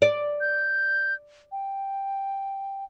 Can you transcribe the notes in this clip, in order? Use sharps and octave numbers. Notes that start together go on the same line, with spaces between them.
D5
G6
G5